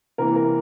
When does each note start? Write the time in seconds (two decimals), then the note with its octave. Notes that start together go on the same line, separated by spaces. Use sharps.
0.18 C3 E3 A#3 A#4
0.36 A#4